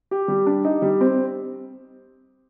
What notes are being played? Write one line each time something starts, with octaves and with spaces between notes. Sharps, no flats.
G4
G3
D4
D#4
G3
C4